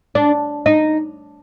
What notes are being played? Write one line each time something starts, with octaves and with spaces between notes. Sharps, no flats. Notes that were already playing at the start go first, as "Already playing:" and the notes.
D4
D#4